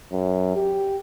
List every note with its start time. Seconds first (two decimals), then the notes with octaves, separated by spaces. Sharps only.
0.12 F#2
0.56 G4